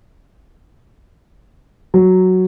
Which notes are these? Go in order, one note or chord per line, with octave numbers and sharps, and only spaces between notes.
F#3